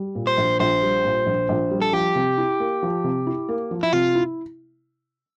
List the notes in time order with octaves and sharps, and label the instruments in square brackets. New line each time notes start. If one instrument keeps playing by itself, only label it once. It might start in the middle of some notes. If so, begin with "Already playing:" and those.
Already playing: [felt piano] G3
A#2
[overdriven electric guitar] C5
[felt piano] A#1
[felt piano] A#1 [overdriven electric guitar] C5
[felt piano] G3
A#2
A#1
A#1
G3
[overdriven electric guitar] A4
[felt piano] F3 [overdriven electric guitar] G4
[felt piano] C3
E4
A#3
F3
C3
E4
A#3
F3
[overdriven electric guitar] E4
[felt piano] C3 [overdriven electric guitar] F4
[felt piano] E4